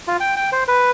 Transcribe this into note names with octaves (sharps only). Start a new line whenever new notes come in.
F4
G5
G5
C5
B4